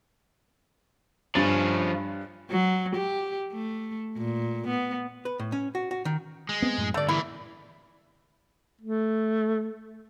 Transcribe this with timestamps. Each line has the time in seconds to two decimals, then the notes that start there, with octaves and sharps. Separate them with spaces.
1.35 G2 F3 C#4 A6
2.50 F#3
2.95 G4
3.53 A3
4.17 A#2
4.67 B3
5.25 B4
5.39 A2
5.52 C#4
5.75 F#4
5.91 F#4
6.05 D#3
6.49 G#3
6.62 B3 C4
6.78 F#2 A2
6.94 G2 D3 A3 D5
7.09 A#2 E3 E4
8.81 A3